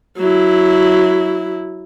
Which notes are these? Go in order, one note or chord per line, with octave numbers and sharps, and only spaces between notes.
F#3 E4